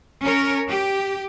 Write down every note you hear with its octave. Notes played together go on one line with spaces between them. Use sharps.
C#4 A#4 C#5
G4